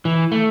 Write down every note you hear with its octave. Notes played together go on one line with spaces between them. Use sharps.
E3
A3